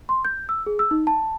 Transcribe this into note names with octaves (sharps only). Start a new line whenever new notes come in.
C6
G6
E6
G#4
E6
D#4
A5